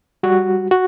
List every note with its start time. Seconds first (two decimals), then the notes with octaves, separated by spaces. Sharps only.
0.23 G3 F#4
0.71 F#4